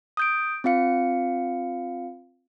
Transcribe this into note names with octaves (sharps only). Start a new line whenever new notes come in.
D#6 G6 D7
C4 F4 F5 C#7